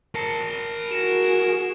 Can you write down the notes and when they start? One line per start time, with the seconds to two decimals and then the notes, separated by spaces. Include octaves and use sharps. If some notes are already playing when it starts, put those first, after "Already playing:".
0.15 A#4 A5 A#6 C7
0.91 F#4 G#4 A#6 C#7 E7